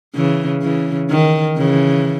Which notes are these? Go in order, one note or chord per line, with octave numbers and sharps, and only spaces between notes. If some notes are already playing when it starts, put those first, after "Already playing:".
C#3 E3
C#3 E3
D#3
C#3 E3